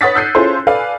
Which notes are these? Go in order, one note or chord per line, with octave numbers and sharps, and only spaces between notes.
B4 C#5 F#5 D#6 A6 B6
E6 F#6 G6 C7 C#7 D#7
C#4 E4 F4 G#4 A4 C5
A4 B4 D5 F5 G#5